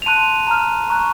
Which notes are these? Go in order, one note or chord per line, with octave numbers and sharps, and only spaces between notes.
F7
A5 C6 F#6 D#7
A#5 F6
A#5 C#6 F#6